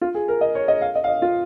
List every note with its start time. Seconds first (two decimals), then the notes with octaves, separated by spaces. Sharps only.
0.01 F4
0.15 G#4
0.28 A#4
0.41 D#5
0.55 C#5
0.68 D#5
0.81 F5
0.95 D#5
1.04 F5
1.08 D#5
1.22 F4